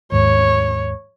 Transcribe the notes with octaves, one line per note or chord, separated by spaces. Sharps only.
D#2 G#2 C#5